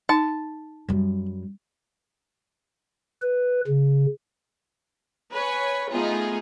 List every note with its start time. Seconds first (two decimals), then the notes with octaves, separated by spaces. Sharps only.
0.09 D#4 A5
0.89 F#2 G3
3.22 B4
3.67 C#3
5.33 B4 C#5 G#5
5.90 A3 B3 D#4 F4 G#4